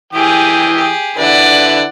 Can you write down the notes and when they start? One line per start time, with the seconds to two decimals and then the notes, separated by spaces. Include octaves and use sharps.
0.13 E3 G4 G#4 G5 D#6
0.76 G4 G#4
1.18 D3 E4 B4 D5 F#5